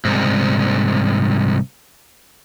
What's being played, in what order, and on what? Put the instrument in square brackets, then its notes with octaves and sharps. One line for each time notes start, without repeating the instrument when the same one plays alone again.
[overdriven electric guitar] C2 G#2